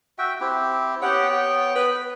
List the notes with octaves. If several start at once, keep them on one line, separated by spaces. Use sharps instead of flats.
F#4 E5 G5
C4 E4 G4
B3 G4 C#5 F#5 G5
G5
B4